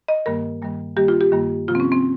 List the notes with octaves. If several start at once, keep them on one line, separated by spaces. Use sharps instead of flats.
D#5
G2 D#3 G3 A#3 A#4
G2 D#3 G3 A#3
G2 D#3 G3 A#3 G4
F4
G4
G2 D#3 G3 A#3
C3 F3 A#3 F4
C4
C#4
C4